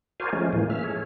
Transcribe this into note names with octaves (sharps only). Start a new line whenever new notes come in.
F#4 A#4 C5 D5 F5 G#5
F3 G#3 A3 C#4
A2 E3 A#3
E5 F6
G#4 A4 C#5